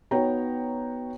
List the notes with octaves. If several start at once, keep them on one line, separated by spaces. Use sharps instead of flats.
B3 D#4 F#4 C#5 G5 A#5